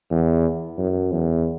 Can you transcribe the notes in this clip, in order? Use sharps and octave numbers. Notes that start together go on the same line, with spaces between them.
E2
F#2
E2